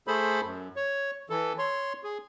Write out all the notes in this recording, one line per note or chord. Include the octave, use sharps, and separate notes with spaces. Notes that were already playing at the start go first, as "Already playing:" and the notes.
A3 G#4 A4 C5 B5
F#2
C#5
E3 A4
C#5 C6
G#4